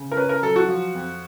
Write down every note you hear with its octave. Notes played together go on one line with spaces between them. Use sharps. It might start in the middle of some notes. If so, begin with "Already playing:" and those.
Already playing: C#3
A#4
C#4 B4
A#4
F#3 A4
F#4
F3
F2